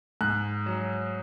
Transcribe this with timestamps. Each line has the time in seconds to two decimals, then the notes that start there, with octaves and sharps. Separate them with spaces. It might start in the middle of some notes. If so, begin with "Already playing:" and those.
0.21 G#2 F#6
0.66 F#3